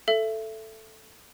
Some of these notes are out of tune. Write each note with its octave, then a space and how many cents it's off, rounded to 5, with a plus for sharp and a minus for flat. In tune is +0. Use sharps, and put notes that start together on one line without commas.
A4 +0 E5 +20